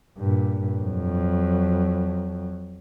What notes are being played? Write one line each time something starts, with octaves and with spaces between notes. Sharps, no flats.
G2 A#2
F2 F#3